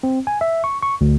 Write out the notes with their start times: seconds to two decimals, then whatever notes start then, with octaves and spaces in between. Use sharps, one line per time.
0.03 C4
0.27 G#5
0.41 E5
0.64 C#6
0.82 C#6
1.01 D2